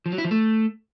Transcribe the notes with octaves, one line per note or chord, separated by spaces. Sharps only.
F3
F#3
E4
F3
A3